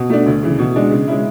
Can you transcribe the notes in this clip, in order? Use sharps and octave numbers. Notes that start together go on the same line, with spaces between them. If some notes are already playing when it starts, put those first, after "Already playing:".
Already playing: B2
A3 D4
D2
C#3 E3
B2
G#3 D4
C#3
G#3 C#4 E4